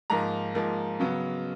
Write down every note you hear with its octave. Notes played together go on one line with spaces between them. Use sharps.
G#2 F3 A#3 A#5
G#2 F3 A#3
C#3 F#3 B3